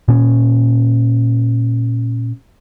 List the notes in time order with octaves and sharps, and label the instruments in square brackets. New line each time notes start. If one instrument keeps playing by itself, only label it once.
[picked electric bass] A#2 C#4